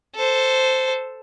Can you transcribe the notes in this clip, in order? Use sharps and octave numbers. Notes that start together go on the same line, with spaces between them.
A4 C5